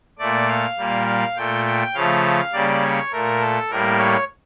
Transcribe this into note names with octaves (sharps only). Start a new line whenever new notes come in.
A#2 A3 D5
F5
A#2 G3 A#3
F5
A#2 A3 G5
G5
C#3 F3 A3 F5
C#3 G3 A#3 D5
C#5
A#2 A3 A#4
A4
A2 G3 A#3 A#4
C#5